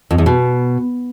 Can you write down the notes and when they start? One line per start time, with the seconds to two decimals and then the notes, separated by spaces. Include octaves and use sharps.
0.11 F2
0.18 E2
0.26 B2